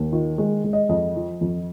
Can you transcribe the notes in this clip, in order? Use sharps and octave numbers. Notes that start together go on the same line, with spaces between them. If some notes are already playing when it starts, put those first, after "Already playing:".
Already playing: D#2
D#3 F4
G#3
G#3
D#5
F2 D#5
F3
F2